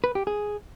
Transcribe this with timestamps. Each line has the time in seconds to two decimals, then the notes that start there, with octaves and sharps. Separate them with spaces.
0.04 B4
0.15 G4
0.27 G#4